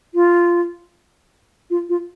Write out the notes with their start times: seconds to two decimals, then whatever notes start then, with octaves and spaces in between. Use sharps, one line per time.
0.15 F4
1.70 F4
1.89 F4